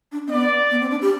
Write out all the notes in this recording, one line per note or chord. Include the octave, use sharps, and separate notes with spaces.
D4
C4
B3 D5
B3
C4
D4
G4